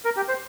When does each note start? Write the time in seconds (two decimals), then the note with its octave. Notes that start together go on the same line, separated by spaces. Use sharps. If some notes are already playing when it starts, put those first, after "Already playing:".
0.05 A#4
0.16 G4
0.28 C5